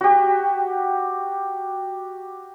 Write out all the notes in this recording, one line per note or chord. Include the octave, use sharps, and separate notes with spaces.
F#4 G4